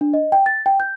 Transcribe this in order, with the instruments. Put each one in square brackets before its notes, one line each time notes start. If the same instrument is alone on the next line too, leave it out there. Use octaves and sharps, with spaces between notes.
[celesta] D4
D#5
G5
A6
G5
G6